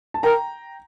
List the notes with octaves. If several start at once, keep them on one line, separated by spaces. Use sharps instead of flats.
A5
A#4 G5 A#5